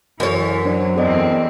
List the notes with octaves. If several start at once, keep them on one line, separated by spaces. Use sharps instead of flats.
F#2 E3 C#5
F#3 D4 C5 D5
E2 C4 A4 D5 D#5